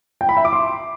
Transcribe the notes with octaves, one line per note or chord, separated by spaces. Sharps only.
G5
B5
E5
D6
C6